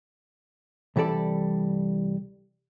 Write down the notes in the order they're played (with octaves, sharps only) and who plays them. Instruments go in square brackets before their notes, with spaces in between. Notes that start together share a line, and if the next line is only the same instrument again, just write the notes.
[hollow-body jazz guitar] C2 E3 G3 A4 D5